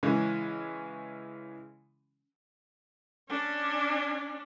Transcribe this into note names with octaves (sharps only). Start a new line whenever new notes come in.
C#3 E3 G#3 C#4
C#4 D4